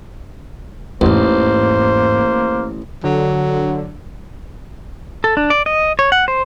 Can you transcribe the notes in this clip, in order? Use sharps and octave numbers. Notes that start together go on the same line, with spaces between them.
A1 E2 G#2 A#3 C5
D3 F#3
A4
D4
D5
D#5
C#5
F#5
C5